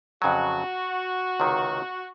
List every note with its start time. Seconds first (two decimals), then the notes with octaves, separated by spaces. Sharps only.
0.22 F2 C#3 F#3 F#4
1.40 C#2 C3 D#3